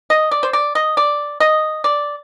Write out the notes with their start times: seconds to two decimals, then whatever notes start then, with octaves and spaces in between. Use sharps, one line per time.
0.10 D#5
0.31 D5
0.43 C5
0.53 D5
0.75 D#5
0.97 D5
1.40 D#5
1.84 D5